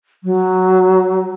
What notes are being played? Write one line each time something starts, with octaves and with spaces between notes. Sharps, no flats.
F#3